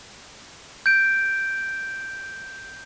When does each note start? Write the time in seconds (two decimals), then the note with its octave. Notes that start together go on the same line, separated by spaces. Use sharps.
0.86 G6 D7